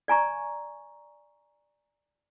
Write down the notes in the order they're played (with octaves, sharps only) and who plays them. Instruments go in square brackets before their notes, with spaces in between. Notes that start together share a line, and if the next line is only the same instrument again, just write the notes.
[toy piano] D5 G#5 A#5 C#6